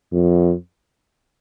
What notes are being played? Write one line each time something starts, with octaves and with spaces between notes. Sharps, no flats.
F2